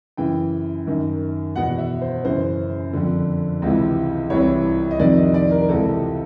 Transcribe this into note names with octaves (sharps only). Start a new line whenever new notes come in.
F#2 C#3 E3 G5
F#2 D#3
E2 B2 F#5
E5
C5
F#2 C#3 E3 C5
F2 D3
C#2 C3 E3
C2 C3 E3 C#5
D#5
F2 C3 D#3 D5
D#5
D5
A#4
A#4
C#2 C3 E3 A4